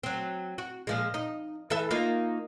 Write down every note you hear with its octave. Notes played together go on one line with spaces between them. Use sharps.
F#3 C4
F#4
A#2 F3 G#3
D#4
E3 A4 E5
A#3 D#4 F4